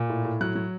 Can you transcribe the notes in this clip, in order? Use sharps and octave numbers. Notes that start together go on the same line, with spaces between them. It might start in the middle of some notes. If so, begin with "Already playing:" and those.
Already playing: A#2
A2
A2
F#3 F#6
F#3